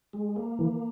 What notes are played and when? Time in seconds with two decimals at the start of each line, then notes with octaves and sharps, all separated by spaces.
0.13 G#3
0.36 A#3
0.59 E3